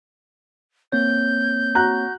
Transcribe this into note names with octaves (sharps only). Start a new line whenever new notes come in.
A#3 C4 C#5 G6
F#4 A#5 F#6